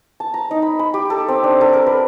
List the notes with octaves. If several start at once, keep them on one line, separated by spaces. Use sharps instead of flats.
A5
A#5
D#4
B5
B5
G4
A4
C4
D4
A4
A#4
B4